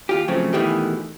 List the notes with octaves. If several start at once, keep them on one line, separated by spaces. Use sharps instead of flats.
D#2 F4 G4
C#3 F3 F#3 A3 C4
B2 D#3 E3 G#3 A3 G4